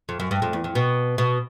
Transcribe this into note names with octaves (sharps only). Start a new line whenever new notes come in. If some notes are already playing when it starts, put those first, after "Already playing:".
F2
F#2
G2
F2
E2
F2
B2
B2